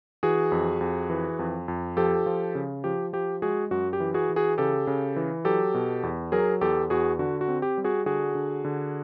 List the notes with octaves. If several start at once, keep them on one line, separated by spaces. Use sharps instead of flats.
E3 F#4 G#4
F2
F2
E3
F2
F2
F3 G4 A4
F3
C#3
F3 G4
F3 G4
G#3 F#4 G#4
F#2 F#4
G4
E3
F#4 G#4
E3
F#4 G#4
C#3 G4 A4
C#3
E3
F#3 G4 A4
B2
E2
F#3 G#4 A#4
E2 G4 A4
E2 F#4 G#4
D3 F#4
F#4
C4
G4
G3
F#4 G#4
D3 F#4 G#4
D3
D3